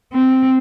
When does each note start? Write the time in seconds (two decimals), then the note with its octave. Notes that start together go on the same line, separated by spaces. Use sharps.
0.13 C4